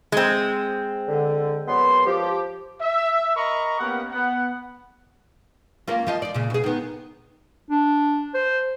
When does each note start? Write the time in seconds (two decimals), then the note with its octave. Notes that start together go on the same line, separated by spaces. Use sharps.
0.12 G#3 C4
1.08 D3
1.68 F#2 B3 C6
2.06 F3 G4
2.81 E5
3.36 A#4 D#5 A#5 B5 C#6
3.79 A#3 B3 C#4 G4 A#4 F#5
4.12 B3 F#5
5.88 A#3 C#4 F4
6.07 F3 F4 D#5
6.22 F4 D5
6.34 A#2 C#3
6.50 B2 G#4
6.64 D#3 B3
7.70 D4
8.34 C5